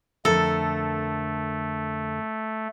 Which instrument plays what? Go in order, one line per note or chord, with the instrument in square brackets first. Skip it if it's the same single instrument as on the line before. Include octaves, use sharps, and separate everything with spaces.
[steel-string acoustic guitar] F2 D3 A#4 [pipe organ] A3 [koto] A4